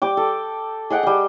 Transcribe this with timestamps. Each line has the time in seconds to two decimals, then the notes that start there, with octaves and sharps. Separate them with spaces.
0.02 G3 G5 D6
0.17 A4
0.90 G#4 D#5 F#5 G5
1.03 G3 G5